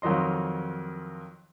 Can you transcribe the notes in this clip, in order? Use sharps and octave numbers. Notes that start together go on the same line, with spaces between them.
F2 D#3 F#3 D#5 C6